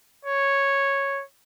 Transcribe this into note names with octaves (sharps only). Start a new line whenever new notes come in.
C#5